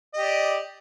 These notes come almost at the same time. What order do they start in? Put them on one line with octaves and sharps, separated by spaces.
D#5 G4 D5